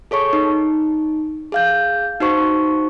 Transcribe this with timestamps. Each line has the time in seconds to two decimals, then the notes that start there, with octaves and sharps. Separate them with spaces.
0.11 G#4 A4 C#5 C#6
0.33 D#4
1.52 G#4 F5 G6
2.21 D#4 F#4 C5 C#6